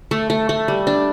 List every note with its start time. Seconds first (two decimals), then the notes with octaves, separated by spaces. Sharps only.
0.11 A3
0.30 A3
0.49 A3
0.68 G3
0.87 D4